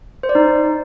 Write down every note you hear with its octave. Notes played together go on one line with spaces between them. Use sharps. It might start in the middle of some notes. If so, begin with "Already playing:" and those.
C5
D5
D#4